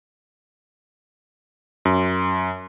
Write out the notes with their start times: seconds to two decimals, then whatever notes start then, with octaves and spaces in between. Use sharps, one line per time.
1.85 F#2